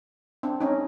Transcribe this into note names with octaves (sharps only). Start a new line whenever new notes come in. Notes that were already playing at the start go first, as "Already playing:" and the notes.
C4 D4
C#4 D#4